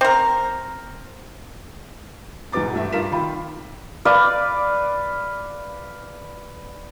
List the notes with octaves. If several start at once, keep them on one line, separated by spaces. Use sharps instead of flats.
C4 A#4
E2 G#2 B2 B3 D6 A6
G2 A3 F#4 E5
G2 F4 A#4 B6 E7
D#3 F4 B5
B4 D5 F5